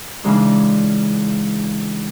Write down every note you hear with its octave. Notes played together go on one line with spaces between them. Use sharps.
C#3 E3 G#3 D4 D#4